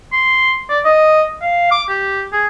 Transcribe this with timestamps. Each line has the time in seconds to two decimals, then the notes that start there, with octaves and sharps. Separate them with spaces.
0.13 C6
0.70 D5
0.85 D#5
1.42 F5
1.71 D6
1.89 G4
2.33 G#4